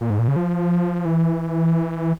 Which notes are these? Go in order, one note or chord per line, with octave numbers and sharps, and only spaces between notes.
A#2
G#2
A#2
C#3
F3
E3